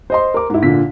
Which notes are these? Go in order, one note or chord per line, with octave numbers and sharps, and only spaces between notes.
C5 D#5 C6
A#4 D6
G#2 E4
A#2 D3 B6